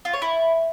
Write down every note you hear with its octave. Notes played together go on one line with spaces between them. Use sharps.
F4
C#5
E4